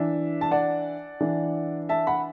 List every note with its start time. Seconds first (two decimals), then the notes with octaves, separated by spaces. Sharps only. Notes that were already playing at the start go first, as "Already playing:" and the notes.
Already playing: E3 D4 E5
0.41 A5
0.51 D5 F#5
1.20 E3 D4
1.89 E5 A5
2.07 F#5 B5